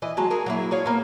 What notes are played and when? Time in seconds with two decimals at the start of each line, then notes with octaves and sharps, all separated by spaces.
0.02 E3 D#5
0.17 F#3 G#3 A5
0.30 F#4 G#4 A#4
0.46 F#3 A#3 E4
0.71 G#4 C#5 F5
0.86 A#3 B3